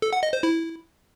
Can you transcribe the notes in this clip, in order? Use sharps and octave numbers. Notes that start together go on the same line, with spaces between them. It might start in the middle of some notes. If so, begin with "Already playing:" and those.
A4
F#5
D#5
C5
E4